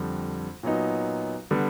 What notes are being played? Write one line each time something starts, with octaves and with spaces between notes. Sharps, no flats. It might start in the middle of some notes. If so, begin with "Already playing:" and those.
Already playing: F2 D3 G3
A#2 F#3 B3 D#4
D3 G3 B3